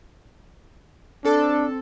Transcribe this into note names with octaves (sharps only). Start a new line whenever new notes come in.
C4 D4 A4